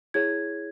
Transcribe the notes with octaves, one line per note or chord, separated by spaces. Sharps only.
E4 G#4 C#5 G#6